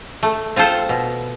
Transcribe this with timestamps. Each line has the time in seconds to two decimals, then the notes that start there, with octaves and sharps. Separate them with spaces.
0.23 A3
0.56 C4 F4 A4 C5
0.89 B2